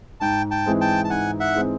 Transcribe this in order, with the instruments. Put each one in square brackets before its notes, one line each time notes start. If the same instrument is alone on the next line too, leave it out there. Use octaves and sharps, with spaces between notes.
[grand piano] G#2 [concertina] G5 A5
[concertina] G5 A5
[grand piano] E3 G#3 C4
[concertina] G5 A5
A5
[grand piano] G#2 [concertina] F#5 G#5
[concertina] E5 F#5
[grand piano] E3 G#3 C4